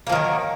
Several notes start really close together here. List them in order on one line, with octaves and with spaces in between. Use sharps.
A#3 F3 D#3 F#3